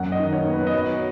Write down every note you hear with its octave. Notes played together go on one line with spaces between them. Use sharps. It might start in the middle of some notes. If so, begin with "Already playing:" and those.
Already playing: F#2 F#5
D#5
D#3
C#5
B3
B4
D#5
F#3 C#5